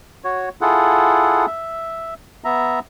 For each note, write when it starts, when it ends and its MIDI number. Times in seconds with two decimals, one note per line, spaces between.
0.24 0.49 66
0.24 0.49 73
0.61 1.46 64
0.61 1.46 65
0.61 1.46 68
0.61 1.46 69
0.61 1.46 78
1.47 2.14 76
2.44 2.79 59
2.44 2.79 76
2.44 2.79 82